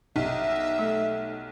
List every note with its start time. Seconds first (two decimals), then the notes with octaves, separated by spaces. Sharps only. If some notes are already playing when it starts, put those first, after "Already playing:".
0.16 B1 D#4 G4 E5
0.79 A3 A4